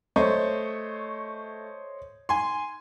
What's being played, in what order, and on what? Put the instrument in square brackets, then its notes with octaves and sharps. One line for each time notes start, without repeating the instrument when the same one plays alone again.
[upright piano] A3 [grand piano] C5 C#5 D#5
[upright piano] G#5 C6